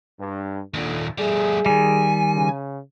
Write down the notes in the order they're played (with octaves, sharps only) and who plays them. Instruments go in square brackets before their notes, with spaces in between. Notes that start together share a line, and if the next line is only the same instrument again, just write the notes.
[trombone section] G2
[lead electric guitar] D#2 A#2 [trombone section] D3
[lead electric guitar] G3 A3 [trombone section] G#4
[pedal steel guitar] D#3 G3 [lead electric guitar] G#5
[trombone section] C#3